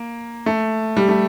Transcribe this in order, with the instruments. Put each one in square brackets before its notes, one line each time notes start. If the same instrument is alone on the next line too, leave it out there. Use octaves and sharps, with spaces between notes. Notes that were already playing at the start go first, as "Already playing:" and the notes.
Already playing: [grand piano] A#3
A3
G3
A3